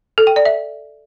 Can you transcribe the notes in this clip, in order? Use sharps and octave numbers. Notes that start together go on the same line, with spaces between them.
A4
G5
D5
E5